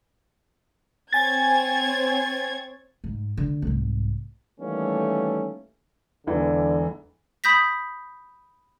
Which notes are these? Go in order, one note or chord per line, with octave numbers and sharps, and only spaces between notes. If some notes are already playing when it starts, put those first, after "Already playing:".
C4 C#5 G#5 G#6 A6
G#2
D3
C2 G#2
D#3 E3 G3 A3 A#3 C#4
E1 D3 E3
B5 D#6 G6 A#6 B6